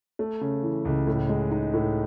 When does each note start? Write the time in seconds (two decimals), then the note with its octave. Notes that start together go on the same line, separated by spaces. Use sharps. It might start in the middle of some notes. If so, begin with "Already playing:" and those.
0.19 A3
0.41 C#3
0.63 E3
0.85 C#2
1.07 A2
1.29 G#3
1.51 D#4
1.74 A2